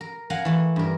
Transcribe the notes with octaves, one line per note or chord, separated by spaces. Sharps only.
A#4
A#4 F5 F#5 G#5 A#5
E3 A3
G2 A#4